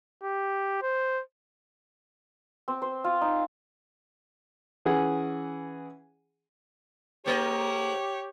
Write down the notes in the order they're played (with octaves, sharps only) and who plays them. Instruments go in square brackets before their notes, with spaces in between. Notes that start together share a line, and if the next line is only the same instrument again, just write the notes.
[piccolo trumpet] G4
C5
[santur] C4
C5
F4
D#4
[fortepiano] E3 C#4 G#4 F#5 G#5
[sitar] G#2 A3 D#5 [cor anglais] G4 [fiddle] C#5